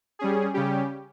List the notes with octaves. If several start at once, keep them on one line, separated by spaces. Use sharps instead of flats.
G3 C#4 G#4
C#3 G3 C#4 G4